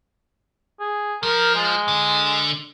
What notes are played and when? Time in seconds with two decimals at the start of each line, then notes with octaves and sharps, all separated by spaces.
0.80 G#4
1.23 F3 A#4
1.55 G#3
1.88 D3